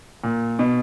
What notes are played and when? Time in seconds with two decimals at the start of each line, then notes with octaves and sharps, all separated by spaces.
0.24 A#2
0.59 B2